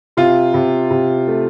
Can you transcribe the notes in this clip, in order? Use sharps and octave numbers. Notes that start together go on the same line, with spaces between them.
C3 F4
C3
C3
A3